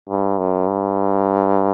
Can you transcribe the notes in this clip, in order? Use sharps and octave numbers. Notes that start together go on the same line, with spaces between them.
G2
F#2
G2